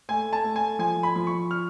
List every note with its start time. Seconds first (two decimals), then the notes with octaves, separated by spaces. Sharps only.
0.09 A3 G#5
0.33 A5
0.44 A3
0.56 G#5
0.79 F3 G#5
1.03 B5
1.16 F3
1.27 C#6
1.51 F6